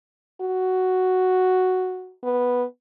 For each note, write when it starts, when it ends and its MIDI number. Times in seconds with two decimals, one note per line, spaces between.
0.42 2.14 66
2.24 2.64 59